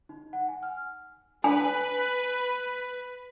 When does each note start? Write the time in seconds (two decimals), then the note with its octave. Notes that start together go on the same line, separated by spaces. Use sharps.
0.09 D#4
0.33 F#5
0.48 G#5
0.63 F6
1.44 B4 G#5